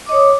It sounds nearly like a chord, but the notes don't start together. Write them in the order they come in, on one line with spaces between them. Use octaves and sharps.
D6 D#5 C#5 D#6